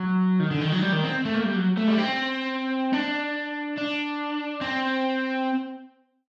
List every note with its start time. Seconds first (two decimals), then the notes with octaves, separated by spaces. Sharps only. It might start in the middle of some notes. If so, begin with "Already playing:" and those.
Already playing: F#3
0.40 D#3
0.51 D3
0.61 D#3
0.72 F#3
0.82 G3
0.93 D#3
1.04 C4
1.25 A3
1.35 A#3
1.45 G3
1.56 F#3
1.78 A3
1.88 G3
1.98 C4
2.93 D4
3.77 D4
4.61 C4